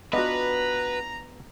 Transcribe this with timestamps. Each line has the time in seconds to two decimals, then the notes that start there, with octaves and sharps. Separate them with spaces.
0.13 B3 D4 F4 F#4 B4 D#5 A#5